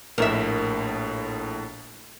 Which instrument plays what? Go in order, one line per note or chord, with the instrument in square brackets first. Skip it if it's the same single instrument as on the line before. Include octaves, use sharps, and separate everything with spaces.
[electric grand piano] A#1 A2 [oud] A#4 E5